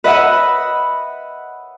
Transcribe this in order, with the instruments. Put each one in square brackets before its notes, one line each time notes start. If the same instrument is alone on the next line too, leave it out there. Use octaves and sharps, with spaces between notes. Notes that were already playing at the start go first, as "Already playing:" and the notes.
[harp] B4 D#5 E5 F#5 B5